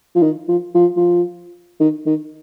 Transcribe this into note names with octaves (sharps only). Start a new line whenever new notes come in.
F3
D#3
F3
F3
F3
D#3
D#3